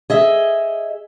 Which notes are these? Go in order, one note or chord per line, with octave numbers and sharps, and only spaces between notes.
G#4 D#5 E5